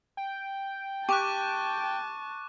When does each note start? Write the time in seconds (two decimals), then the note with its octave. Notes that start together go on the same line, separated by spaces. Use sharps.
0.17 G5
1.09 G4 A5 C#6 D6 F#6